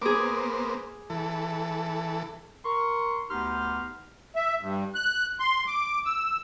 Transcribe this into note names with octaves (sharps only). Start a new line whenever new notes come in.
A#3 B3 G#4 C5 D6
E3 A4
A#4 C6 C#6
D2 B3 D#4 G4 C6 F6
E5
G2
F#6
C6
D6
E6